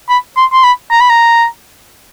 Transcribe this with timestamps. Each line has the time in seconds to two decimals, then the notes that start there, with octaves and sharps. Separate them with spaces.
0.09 B5
0.37 C6
0.53 C6
0.64 B5
0.91 A#5
1.01 B5
1.10 A#5